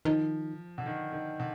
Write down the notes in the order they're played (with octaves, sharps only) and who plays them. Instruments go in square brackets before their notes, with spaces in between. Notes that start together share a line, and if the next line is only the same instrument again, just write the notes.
[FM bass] D#3 [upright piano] F3
[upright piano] D3
D#3
D#3
D3